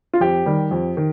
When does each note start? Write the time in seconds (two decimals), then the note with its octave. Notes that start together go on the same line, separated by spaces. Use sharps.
0.14 F4
0.20 F2 G4
0.46 D#3 G3
0.71 F2
0.97 D#3